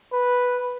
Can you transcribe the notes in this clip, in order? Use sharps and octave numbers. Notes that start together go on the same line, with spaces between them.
B4